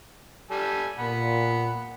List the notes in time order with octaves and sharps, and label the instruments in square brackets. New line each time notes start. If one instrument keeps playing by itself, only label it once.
[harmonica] G3 A4 G#5
[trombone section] A#2 [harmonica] F#5 B5